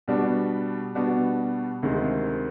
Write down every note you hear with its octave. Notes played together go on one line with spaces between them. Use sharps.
B2 G3 B3 D4 F#4
B2 G3 B3 D4 F#4
D2 C3 D#3 G#3